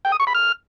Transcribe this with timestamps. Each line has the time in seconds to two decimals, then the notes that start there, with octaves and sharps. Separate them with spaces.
0.05 G5
0.12 D#6
0.20 C#6
0.27 B5
0.35 F6